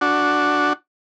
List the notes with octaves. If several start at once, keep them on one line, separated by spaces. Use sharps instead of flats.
D4 F#4